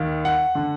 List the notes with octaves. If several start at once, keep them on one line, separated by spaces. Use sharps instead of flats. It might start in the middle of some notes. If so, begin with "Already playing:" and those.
Already playing: D#2 D#3
F#5
D3